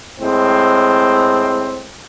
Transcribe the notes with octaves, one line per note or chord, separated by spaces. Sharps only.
A2 G#3 C4